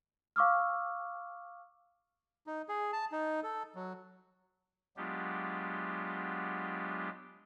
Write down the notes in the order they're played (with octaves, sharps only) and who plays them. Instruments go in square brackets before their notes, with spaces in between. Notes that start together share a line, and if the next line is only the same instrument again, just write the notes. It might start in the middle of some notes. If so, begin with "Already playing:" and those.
[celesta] F5 C#6 D6 E6 F6
[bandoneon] D#4
G#4
A5
D#4
A4
F#3
[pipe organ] F#3 G#3 B3 D4 F4 G4